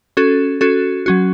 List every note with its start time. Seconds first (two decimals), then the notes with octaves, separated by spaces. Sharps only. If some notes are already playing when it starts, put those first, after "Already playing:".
0.17 C#4 F#4 A4
0.61 C#4 F#4 A4
1.06 F#3 C#4 F#4